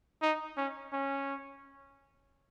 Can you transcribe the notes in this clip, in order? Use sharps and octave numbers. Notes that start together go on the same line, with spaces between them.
D#4
C#4
C#4